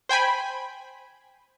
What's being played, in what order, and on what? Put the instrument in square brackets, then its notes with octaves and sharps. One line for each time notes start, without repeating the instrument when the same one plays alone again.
[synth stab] C5 G5 G#5 B5